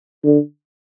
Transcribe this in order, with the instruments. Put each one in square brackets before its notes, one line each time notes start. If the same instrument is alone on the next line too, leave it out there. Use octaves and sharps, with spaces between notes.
[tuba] D3